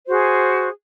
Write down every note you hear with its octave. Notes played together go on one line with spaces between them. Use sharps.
F#4 G#4 C5